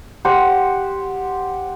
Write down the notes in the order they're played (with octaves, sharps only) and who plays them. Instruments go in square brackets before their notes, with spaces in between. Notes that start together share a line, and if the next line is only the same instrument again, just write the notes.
[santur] G4 C5 F#5